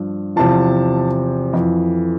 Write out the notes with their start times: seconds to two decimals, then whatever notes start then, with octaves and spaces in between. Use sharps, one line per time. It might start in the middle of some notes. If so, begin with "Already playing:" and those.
Already playing: G2 F3
0.36 E2 C3 F3 A5
1.53 F2 E3